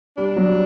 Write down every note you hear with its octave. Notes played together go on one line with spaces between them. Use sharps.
G3 D4
F#3